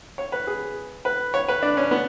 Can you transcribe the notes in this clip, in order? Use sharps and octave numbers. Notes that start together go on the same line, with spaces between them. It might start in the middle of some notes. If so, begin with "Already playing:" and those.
C#5
B4
G#4
B4
C#5
B4
D4
C#4
B3